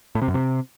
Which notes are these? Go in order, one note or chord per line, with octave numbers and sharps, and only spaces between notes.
A2
C3
F#2
C3